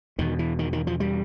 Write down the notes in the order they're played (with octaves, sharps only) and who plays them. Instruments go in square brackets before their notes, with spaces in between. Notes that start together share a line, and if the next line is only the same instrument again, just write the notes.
[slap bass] E2 B2 D#3
E3
D#3
D#3
F3
G3